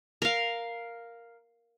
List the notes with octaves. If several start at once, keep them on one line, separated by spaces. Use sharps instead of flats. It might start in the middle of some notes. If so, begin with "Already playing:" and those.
A#4 F5